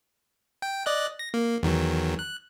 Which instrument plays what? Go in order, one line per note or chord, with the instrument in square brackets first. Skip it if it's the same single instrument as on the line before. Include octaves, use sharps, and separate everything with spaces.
[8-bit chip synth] G5
D5 D#5 F#6
A#6
A#3
E2 D#3 F#3
F#6